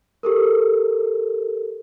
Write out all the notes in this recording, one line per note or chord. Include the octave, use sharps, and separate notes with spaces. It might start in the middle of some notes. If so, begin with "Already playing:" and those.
G4 A4 A#4